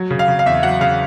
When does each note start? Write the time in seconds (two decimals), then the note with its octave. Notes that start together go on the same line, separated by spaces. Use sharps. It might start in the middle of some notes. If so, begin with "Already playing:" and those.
Already playing: F#3
0.11 C#3
0.19 F5
0.28 C#3
0.39 F5
0.46 E2 E5
0.63 F#3 F#5
0.81 C#3 F5